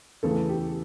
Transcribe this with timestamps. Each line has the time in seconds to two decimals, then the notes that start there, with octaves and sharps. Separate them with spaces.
0.23 E2 C#3 E3 A3 A4
0.49 G4